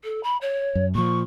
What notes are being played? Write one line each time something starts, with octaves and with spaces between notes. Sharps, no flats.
A4
B5
C#5
F#2
A#2 F3 C#6